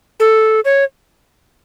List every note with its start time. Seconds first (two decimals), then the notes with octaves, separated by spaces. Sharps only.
0.20 A4
0.65 C#5